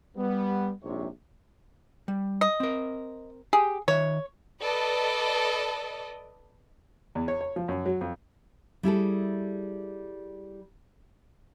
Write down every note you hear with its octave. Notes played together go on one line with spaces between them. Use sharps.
G3 B3
A#1 G#2 C3 C#5
G3
D#5
C4 A#4
G4 G#4
D#3 C#5 E5
A4 B4 D5 D#5
E2
C#5
C#5
F3
F#2
F#3
F2
G3 E4 G#4 A4